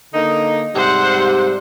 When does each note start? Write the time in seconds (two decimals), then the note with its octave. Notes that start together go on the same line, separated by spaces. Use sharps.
0.14 D3 A#3 D#4
0.75 G#2 C3 G3 C5 F#5